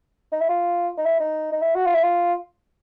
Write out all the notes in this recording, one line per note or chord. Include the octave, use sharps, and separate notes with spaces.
D#4
E4
F4
D#4
E4
D#4
D#4
E4
F#4
F4
E4
F4